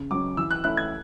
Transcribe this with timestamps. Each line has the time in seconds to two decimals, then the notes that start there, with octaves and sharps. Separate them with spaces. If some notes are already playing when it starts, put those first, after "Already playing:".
Already playing: C#3
0.11 F#3 C#4 D6
0.37 E3 E6
0.51 F#6
0.64 A3 C#4 E4 F#6
0.77 G#6